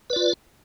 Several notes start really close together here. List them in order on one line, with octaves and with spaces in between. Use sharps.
B4 D5 F4